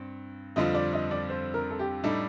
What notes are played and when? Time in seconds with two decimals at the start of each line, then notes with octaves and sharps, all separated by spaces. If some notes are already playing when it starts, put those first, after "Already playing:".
Already playing: G2 C4
0.56 F2 D3 G3 C4 F4 D#5
0.74 D5
0.93 D#5
1.11 D5
1.30 C5
1.54 A#4
1.71 A4
1.79 G4
2.04 A2 G3 D4 D#4 A4